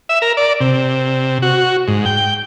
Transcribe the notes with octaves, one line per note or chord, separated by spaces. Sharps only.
E5
A#4
D5
C3
F#4
G#2
G5